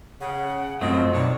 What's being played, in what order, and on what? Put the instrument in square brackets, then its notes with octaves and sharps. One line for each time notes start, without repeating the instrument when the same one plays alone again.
[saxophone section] C#3 [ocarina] F#5
[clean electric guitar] F#2 A3 C4 [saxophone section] F3 F#3 F4 [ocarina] D#5
[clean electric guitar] B1 [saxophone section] D#3 D4 C#5